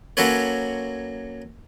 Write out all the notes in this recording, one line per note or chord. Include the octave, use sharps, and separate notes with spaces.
F#3 A#3 C#4 A4 B4 C#5